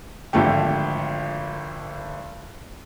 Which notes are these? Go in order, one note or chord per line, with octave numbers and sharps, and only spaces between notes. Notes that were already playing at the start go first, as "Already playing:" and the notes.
G#1 D3 F3 A3 G4